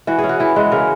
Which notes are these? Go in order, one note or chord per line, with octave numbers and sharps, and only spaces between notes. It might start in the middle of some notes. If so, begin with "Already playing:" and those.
E3 F#4
C#4 G#4
F#4
E3 E4
G#3 F#4
C#3 A#4